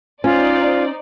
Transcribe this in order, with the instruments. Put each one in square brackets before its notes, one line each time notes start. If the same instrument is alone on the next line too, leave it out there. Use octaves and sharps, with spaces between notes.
[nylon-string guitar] C#4 [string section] D#4 C5 D5 [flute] F4